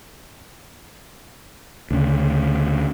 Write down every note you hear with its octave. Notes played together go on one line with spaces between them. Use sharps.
D2 C#3